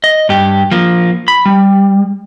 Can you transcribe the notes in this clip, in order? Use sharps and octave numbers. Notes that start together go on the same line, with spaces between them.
D#5
G2 G4
F3 A#3
B5
G3